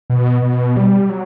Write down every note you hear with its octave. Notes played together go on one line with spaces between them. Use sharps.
B2
B2
G3
F#3